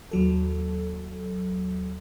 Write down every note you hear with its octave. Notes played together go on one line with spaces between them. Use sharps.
D#2 F#3 A4